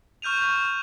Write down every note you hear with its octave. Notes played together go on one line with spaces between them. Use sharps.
C#6 F6 G6 D#7 F7